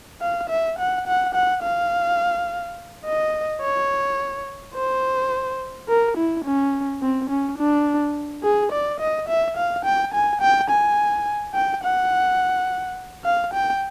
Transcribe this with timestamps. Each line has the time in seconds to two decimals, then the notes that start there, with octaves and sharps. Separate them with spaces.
0.21 F5
0.50 E5
0.79 F#5
1.07 F#5
1.34 F#5
1.63 F5
3.06 D#5
3.61 C#5
4.75 C5
5.89 A#4
6.17 E4
6.45 C#4
7.02 C4
7.30 C#4
7.58 D4
8.43 G#4
8.72 D5
9.00 D#5
9.29 E5
9.57 F5
9.85 G5
10.14 G#5
10.42 G5
10.70 G#5
11.55 G5
11.83 F#5
13.25 F5
13.54 G5